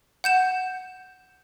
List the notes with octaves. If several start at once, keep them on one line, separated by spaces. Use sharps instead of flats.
F#5 G6 E7